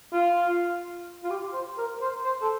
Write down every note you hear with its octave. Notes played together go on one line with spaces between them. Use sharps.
F4
F4
G4
C5
A#4
C5
C5
A4